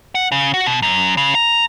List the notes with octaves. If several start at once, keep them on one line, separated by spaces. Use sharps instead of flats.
F#5
C#3
F#4
B2
F#2
C#3
A#5